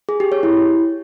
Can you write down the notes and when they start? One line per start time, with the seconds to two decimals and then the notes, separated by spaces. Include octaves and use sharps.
0.09 G#4
0.20 G4
0.32 C#5
0.43 E4